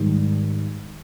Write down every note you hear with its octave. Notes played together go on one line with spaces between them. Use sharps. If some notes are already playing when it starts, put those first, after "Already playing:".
Already playing: G#2 D#3 G3